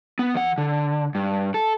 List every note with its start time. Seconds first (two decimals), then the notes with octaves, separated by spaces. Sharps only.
0.19 B3
0.34 E3 F#5
0.58 D3
1.15 G2
1.54 A4